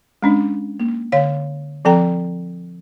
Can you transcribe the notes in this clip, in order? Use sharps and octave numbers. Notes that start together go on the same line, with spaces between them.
G#3 C#4 D4
A#3
D3 C#5 F5
F3 C4 A4 G5 A#5